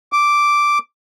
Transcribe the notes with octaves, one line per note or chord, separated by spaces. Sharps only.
D6